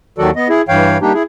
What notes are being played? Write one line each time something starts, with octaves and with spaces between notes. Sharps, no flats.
D#2 D#3 F#3 F#4 A4 D5
B3 D#5
E4 G#4
G2 E3 C#5 F5 G5
G3 A#3 D4 D#4 G4
E4 G#4